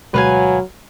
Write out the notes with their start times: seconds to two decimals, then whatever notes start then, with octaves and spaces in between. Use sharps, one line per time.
0.14 D2 B2 F#3 G#3 B4 F5 G#5